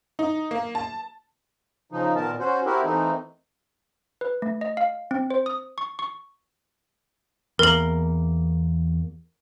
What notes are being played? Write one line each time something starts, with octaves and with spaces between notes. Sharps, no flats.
D#4
A#3
A5
C#3 F3 D#4
A#2 D#3 B3 A#4 A5
C#4 F#4 C5
C4 E4 F#4 G4 A#4
E3 A3 A#3 C4 D#4
B4
A3
D#5
F5
C4
C5
D#6
C#6
C#6
E2 A#3 A#4 F#7